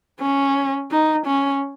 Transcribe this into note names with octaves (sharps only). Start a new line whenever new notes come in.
C#4
D#4
C#4